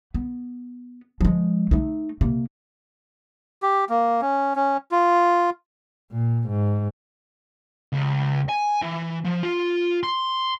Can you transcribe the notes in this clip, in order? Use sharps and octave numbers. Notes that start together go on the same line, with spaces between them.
B3
F3 G#3
A3 D#4
C3 A#3
G4
A#3
C#4
C#4
F4
A#2
G#2
C#2
G#5
E3
F3
F4
C6